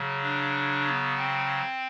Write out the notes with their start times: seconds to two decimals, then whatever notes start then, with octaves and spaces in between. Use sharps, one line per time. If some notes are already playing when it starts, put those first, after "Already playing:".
Already playing: C#3 F#3
0.23 D4
0.86 B3
1.17 C4